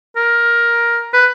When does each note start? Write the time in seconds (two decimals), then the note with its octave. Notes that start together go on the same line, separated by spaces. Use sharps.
0.17 A#4
1.13 B4